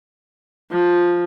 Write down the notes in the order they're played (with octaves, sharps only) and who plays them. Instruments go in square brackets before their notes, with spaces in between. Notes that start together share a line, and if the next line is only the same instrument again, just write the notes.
[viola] F3